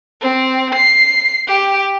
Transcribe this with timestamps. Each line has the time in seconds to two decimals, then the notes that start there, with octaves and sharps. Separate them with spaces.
0.22 C4
0.75 C7
1.48 G4